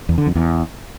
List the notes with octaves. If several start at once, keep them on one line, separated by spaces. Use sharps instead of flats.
E2
D3
F2
E2